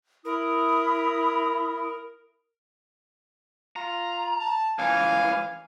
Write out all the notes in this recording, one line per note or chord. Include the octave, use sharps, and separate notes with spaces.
E4 A#4 B5 D#6
F4 A#5
A5
C#2 E3 F5 G#5